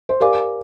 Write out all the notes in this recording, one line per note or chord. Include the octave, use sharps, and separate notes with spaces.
C5
G4 A#4 D5 F5 G#5 D6